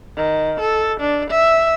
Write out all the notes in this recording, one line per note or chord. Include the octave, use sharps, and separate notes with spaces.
D#3
A4
D4
E5